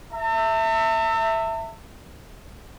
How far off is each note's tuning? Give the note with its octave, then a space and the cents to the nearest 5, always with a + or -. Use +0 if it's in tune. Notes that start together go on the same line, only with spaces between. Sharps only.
E5 +0 A5 +45